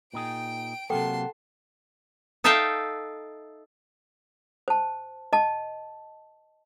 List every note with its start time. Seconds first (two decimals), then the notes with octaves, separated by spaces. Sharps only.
0.14 A#2 D#4 G#4 G5 D7
0.90 C3 F#3 A#3 A4 F#5 G5 A5 C6
2.44 D#4 A4 E5 F5 G5 A5
4.68 C5 A5
5.33 D#5 A5